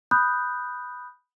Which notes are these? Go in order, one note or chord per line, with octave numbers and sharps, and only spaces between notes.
B5 D#6 F#6 G6